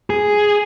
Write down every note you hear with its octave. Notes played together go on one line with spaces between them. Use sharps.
G#4